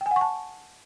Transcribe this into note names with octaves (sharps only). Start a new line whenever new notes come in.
G5
G#5
F#5
C#6
A5